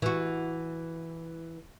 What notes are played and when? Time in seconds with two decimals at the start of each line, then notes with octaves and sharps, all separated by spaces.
0.02 E3 F#4